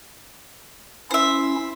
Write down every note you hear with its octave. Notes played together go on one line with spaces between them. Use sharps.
C#4 E4 C5 E5